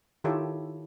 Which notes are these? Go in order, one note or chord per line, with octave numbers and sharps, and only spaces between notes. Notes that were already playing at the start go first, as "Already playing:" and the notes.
D#3 E4 F4 G4 A4 C#5